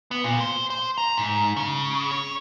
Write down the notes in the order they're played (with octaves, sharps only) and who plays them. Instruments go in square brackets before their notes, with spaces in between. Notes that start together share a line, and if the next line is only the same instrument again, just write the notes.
[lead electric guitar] B3
A#2
C5
C5
A#5
G#2
C#3
C#5